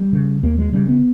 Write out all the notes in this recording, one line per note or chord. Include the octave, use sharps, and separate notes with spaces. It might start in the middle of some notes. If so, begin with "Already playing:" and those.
Already playing: G3
C#3
D#2 A#3
G#3
C#3 G3
B3